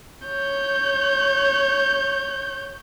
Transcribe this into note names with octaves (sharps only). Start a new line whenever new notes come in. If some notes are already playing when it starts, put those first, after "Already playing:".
C#5 G6